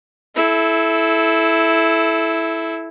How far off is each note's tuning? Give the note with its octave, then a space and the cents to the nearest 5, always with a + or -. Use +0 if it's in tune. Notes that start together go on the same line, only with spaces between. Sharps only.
E4 +0 A4 -20